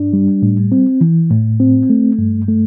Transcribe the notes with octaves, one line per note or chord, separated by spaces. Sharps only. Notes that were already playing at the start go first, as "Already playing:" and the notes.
Already playing: G2 D4
G3
A2
C4
E3
A2
C4
A3
G2
A3